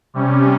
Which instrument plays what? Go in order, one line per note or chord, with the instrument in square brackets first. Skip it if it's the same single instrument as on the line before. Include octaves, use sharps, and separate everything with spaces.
[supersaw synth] C3 G3 C#4